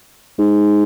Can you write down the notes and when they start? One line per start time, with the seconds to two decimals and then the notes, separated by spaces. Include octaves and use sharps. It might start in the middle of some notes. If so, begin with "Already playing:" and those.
0.38 G#2